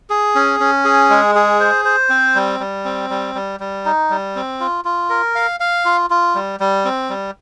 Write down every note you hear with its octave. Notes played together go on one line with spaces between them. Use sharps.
G#4
C#4
C#4
G#4
G#3
G#4
C5
C5
C4
G3
G3
C4
G3
G3
G3
D#4
G3
C4
F4
F4
A#4
F5
F5
F4
F4
G3
G3
C4
G3